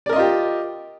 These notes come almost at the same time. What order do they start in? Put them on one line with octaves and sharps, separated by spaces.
D5 A#4 D#5 F4 G4